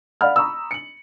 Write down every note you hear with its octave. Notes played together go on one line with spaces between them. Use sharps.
D5 F5 F#5 B5 F6
A#5 B5 C#6 D#6 E6
C#7 F#7